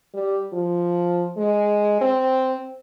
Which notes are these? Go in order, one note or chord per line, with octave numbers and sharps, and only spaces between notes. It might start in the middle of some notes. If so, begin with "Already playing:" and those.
G3
F3
G#3
C4